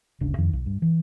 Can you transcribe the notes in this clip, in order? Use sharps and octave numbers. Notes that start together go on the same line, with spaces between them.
D1 G1 C#3 D4
F2 D#3
B1
G2
E3